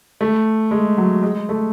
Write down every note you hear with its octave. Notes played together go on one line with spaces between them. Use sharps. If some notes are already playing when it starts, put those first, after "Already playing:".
A3
G#3
F#3
G#3
A3